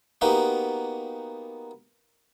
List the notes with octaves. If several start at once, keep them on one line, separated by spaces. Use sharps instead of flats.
A#3 B3 D#4 F#4 G4